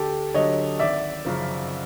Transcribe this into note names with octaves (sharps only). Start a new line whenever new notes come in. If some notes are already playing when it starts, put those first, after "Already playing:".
Already playing: D2 G4 A4
D3 F#3 C#5 D#5
G#1 D5 E5
F#2 C#3 F3